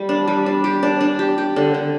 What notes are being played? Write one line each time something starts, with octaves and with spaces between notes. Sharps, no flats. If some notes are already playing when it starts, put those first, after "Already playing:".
Already playing: G3
D4
G3
D4
G4
D4
D4
G4
G4
D3
D3